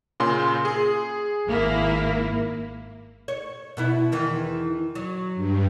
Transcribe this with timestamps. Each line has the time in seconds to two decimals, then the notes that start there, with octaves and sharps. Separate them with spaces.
0.20 A#2 C#3 C6
0.65 G#4
1.46 G#1 A#3 E4
3.28 C#5
3.77 B2 B3 E4
4.12 E2 D#3 E3
4.95 F#3
5.35 G2